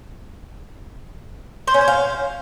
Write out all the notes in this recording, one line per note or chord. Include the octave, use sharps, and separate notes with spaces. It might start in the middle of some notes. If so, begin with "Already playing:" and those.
C5
C#4
C5
F5